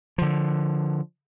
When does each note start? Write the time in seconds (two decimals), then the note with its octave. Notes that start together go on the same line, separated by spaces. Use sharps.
0.18 D3 F3